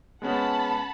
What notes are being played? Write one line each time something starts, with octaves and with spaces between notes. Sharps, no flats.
G#3 B3 C#4 F#5 A5 B5